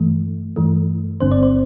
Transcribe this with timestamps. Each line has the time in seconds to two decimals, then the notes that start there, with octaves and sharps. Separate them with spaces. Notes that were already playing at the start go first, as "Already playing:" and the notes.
Already playing: G2 E3 A3
0.56 G2 E3 A3
1.20 G1 G2 D3 C4 C5
1.31 D5
1.43 C5